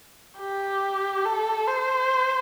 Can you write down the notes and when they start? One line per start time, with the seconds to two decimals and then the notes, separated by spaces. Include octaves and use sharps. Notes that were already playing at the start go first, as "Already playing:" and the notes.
0.39 G4
1.25 A4
1.67 C5